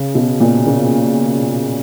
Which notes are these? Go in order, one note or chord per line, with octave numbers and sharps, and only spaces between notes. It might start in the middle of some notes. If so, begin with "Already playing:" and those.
Already playing: C#3
B2
A#2
C#3